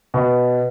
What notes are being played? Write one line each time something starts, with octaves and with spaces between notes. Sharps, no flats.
B2